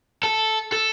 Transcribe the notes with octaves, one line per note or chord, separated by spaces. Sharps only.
A4
A4